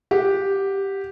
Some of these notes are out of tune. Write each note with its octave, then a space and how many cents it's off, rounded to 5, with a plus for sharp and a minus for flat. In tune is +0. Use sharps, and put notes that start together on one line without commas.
G4 +0 F#5 +0